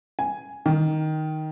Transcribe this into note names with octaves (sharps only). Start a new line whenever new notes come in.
G#5
D#3